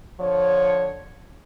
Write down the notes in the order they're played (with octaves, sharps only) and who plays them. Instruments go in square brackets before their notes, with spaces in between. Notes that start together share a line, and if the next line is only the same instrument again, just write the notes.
[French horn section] D3 F3 C#5